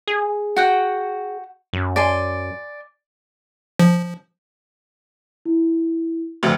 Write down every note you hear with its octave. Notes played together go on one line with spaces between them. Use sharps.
G#4
F#4 F#5 G5
F#2
D5 G#5 C6
F3
E4
F1 D2